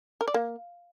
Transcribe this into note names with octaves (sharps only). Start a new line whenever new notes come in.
A#4
D5
A#3